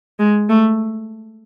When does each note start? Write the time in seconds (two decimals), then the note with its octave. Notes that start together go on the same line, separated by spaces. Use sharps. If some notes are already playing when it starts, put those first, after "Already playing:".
0.19 G#3
0.49 A3